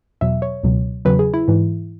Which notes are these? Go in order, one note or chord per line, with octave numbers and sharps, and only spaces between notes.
E2 B2 F#3 E5
C#5
C#2 B2 F#3
E2 C#3 F#3 B4
G#4
E4
G#2 E3